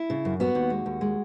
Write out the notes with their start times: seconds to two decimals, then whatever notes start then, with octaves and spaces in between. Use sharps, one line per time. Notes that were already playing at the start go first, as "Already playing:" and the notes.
Already playing: E4
0.10 C#3
0.25 F#2
0.40 B3 F#4
0.55 D#2
0.70 G#3
0.86 D#2
1.01 G#3